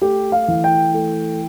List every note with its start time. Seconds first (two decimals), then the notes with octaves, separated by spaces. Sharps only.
0.01 A3 G4
0.32 F5
0.48 E3
0.64 G5
0.94 A3